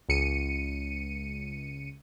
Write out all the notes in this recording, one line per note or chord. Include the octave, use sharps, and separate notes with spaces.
C#2 C#7 D#7